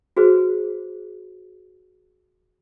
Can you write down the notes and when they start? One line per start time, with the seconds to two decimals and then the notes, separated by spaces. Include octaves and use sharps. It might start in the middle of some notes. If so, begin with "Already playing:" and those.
0.17 F#4 G#4 B4 C5